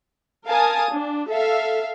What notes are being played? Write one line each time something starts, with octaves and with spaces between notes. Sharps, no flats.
A#4 F5 G#5 A5 D#6
D4
A4 E5 F5